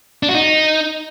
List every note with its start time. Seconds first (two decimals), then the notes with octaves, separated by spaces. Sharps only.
0.23 D4
0.29 F#4
0.35 D#4